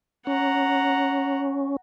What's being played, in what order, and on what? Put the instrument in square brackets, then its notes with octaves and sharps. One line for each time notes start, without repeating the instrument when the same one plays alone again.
[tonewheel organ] C#4 [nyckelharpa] F#5 A#5